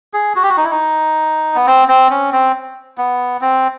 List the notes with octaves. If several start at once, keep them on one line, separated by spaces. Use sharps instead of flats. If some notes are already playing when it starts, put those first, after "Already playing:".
G#4
F#4
G4
F#4
D#4
E4
D#4
B3
C4
C4
C#4
C4
B3
C4